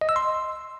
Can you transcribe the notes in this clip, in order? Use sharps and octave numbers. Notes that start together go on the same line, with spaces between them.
D#5
E6
C6